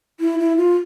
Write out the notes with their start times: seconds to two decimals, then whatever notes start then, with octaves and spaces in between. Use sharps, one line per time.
0.20 E4
0.39 E4
0.57 F4